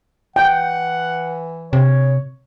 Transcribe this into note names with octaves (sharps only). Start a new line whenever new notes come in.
E3 F#5 G5
C3 C#5